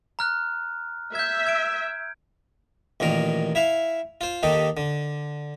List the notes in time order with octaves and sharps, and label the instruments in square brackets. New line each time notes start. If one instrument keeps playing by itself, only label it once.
[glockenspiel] A#5 F6 F#6
[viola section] E5 [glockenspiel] G6 G#6
[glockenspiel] G#6 D7
[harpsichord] A1 A#2 D#3 A#4
E4 E5 F5
F4 C5
D#2 D#3 D#4 G4 A4
D3